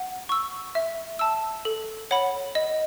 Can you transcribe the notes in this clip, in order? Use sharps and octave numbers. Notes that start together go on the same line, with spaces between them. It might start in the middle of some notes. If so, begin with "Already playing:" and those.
Already playing: F#5
C#6 E6
E5
A5 E6
A4
C#5 F#5 B5
D#5